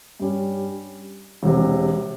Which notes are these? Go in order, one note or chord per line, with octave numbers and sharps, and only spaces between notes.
G2 G3 C#4
E1 E2 C3